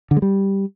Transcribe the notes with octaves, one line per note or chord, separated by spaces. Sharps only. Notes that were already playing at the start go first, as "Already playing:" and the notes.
D3
G#3
G3